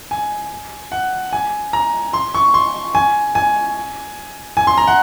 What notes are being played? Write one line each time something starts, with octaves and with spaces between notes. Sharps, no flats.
G#5
F#5
G#5
A#5
C6
C#6
C6
G#5
G#5
G#5
C6
A#5
F#5